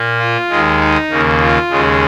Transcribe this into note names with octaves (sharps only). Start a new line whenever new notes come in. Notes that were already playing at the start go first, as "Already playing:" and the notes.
Already playing: A#2 A#3
F4
D#2 D#3 G#3
D#4
D#2 C#3 A#3
F4
D#2 C#3 G#3